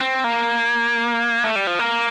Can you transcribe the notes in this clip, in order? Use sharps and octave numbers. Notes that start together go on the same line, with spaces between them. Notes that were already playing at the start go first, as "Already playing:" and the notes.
C4
A#3
A3
G3
F3
A#3